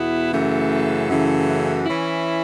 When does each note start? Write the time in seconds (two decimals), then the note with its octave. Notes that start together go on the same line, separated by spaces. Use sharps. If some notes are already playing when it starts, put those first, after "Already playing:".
Already playing: E2 B2 B3 E4
0.32 F#2 C#3 E3 A3
1.08 F#2 C#3 E3 A3
1.85 E3 C#4 E4